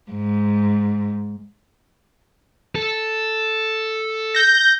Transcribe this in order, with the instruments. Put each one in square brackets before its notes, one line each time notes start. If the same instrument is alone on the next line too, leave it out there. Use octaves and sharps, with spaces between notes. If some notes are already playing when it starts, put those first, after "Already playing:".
[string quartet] G#2
[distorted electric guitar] A4
[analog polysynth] G6 A#6